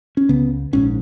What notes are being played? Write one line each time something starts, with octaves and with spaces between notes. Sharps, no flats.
C#4
C#2 C#3 B3
A#1 G#2 C#4